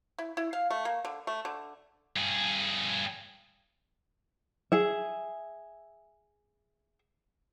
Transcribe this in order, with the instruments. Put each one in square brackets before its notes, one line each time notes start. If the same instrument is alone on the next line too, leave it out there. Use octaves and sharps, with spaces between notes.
[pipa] E4
E4
F5
A3
A#3
D3
A3
D3
[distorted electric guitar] G2 G#4
[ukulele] G#4 E5